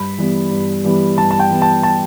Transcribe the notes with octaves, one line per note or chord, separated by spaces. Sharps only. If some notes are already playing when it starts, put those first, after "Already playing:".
Already playing: G2 B5
E3 G3 B3
G2
E3 G3 B3
G2 A5
A5
G5
E3 G3 B3
A5
A5